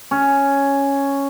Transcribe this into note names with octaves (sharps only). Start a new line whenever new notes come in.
C#4